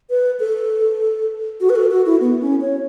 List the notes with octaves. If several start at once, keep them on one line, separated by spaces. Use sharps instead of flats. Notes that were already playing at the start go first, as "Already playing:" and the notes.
B4
A4
F#4
B4
A4
F#4
E4
B3
C#4
C#5